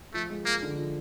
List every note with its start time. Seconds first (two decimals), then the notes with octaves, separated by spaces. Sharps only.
0.14 F3 A3
0.30 G#3
0.45 G#3 A#3
0.62 D3
0.78 F3